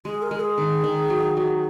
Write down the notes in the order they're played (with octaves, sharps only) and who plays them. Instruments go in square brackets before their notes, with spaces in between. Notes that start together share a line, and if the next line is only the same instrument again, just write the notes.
[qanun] G#3 [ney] G#4
[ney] A#4
[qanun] G#3
[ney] G#4
[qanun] D#3
D#3
F#3
F#3